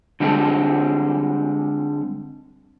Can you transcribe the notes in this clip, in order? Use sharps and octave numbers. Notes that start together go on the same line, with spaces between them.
D3 G3 G#3 C4 A4